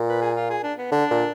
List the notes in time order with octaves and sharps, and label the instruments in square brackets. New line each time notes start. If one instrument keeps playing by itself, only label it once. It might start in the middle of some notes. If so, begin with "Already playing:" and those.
Already playing: [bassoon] A#2
[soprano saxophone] B4
G#4
F4
G#4
D4
B3
[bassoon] D3 [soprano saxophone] D4
[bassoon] A#2